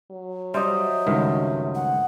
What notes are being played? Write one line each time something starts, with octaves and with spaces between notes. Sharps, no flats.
F#3
G3 C5 D#5 E5
C#2 G2 D#3 A3
F#5